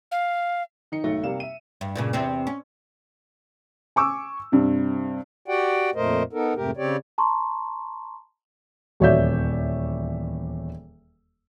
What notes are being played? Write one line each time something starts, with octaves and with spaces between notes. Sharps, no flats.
F5
D#3 D#4 C#7
B1 G#2 D#3 A3 A#6
C3 G3 A#3 F5 E7
E5 D#7
G2
G2 A#2 C#3
E2 C3 C4
C#4
G#5 C#6 D6 E6
G2 C3
F#4 G4 D5 F#5 G5
F2 A#2 A3 A#4 C5 D#5
B3 D#4 A4 A#4
F2 G#2 C3 A3 G4 A#4
C#3 C4 G4 C#5 D5
A5 A#5 C6 C#6
D#1 E2 C#5 D5 E5 G6